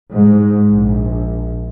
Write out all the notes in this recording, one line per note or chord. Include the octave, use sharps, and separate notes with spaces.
G#2
A#1